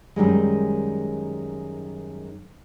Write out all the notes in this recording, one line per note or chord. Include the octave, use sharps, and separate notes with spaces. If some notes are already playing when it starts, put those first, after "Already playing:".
F#2 D#3 G3 G#3